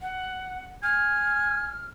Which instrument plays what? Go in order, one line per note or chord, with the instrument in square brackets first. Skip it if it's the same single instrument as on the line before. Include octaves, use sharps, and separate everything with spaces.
[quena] F#5
[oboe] G#5 [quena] F6